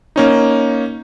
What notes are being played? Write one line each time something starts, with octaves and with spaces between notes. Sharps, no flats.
A#3 C#4 D#4